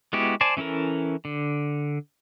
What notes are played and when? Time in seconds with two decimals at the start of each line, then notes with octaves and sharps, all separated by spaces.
0.13 G#3 B3 E4 F#4 G4
0.41 C5 D5 G#5 A5
0.57 E3 C#4 E4 A4 A#4
1.25 D3